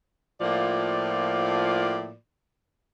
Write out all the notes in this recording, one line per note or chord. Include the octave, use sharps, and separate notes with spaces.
A2 F3 A#3 F4 D5